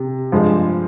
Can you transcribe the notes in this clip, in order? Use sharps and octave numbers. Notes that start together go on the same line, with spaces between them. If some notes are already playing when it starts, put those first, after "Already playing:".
Already playing: C3
G2 F3 G#3